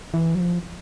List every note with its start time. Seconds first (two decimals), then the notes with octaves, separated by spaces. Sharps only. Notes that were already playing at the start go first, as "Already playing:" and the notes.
0.14 E3
0.35 F#3
0.40 F3